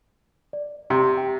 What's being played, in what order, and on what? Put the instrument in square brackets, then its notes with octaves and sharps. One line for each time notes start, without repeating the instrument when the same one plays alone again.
[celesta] D5
[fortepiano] C3 [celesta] A#5 C6
[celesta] G5